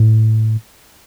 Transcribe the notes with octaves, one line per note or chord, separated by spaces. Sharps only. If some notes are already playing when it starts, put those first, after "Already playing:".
Already playing: A2